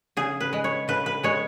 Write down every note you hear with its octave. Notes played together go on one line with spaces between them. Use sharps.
C#3 G#4
B4
G#3
C#5
C#3 B4
B4
G#3 C#5